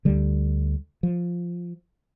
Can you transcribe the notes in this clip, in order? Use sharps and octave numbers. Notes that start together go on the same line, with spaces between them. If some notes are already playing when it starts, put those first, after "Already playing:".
D2 D3 G3
F3